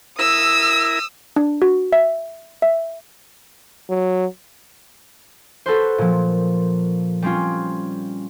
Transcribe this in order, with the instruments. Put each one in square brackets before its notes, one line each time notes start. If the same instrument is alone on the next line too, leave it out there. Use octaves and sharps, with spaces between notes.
[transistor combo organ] E4 A#4 E5 [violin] D#6 E6
[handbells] D4
F#4
E5
E5
[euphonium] F#3
[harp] F#4 A4 B4 C5
A#2 F3
G3 C4 C#4 F4